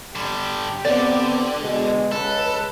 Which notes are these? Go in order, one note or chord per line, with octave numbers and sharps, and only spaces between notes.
D3 G3 G4
D3 B3 C4 D5
B2 G#3
C#2 G#3 A4 B4